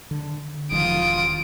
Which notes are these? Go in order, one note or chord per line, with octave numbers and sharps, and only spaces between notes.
D3
E1 D#3 F3 F4 D#6 D7